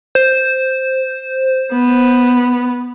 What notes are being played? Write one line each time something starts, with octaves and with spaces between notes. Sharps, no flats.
C5
B3